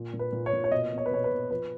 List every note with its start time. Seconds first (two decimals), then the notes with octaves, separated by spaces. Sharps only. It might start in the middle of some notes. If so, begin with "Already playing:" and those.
Already playing: A#2
0.14 A#2
0.19 B4
0.33 A#2
0.46 C#5
0.53 A#2
0.64 C#5
0.71 B2 D#5
0.92 B2
0.98 C#5
1.06 B4
1.11 B2 C#5
1.24 B4
1.31 B2
1.51 F3 B4